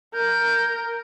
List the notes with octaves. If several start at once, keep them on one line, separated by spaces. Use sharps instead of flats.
A#4 G6